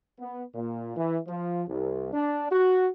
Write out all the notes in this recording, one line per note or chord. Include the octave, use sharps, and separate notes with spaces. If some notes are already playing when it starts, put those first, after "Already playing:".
B3
A#2
E3
F3
C2
D4
F#4